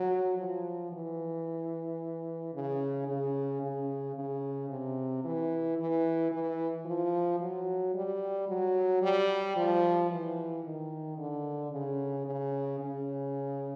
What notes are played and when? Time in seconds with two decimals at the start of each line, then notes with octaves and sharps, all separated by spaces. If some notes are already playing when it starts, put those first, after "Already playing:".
Already playing: F#3
0.38 F3
0.92 E3
2.54 C#3
3.08 C#3
3.63 C#3
4.16 C#3
4.70 C3
5.24 E3
5.78 E3
6.32 E3
6.86 F3
7.40 F#3
7.94 G3
8.48 F#3
9.02 G3
9.56 F3
10.10 E3
10.64 D#3
11.18 D3
11.72 C#3
12.26 C#3
12.80 C#3